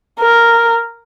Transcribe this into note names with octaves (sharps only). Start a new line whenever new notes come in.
A#4